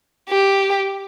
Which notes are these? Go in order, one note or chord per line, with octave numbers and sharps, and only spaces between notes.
G4